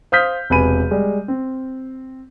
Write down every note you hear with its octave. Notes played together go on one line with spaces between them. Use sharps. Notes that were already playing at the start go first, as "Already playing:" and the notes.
C5 F5 D#6 F6 G6 B6
E1 C3 B4 G#5 B5 D#7
G3 G#3
C4